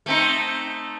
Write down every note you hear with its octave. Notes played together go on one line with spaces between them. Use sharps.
A3 C4 D#4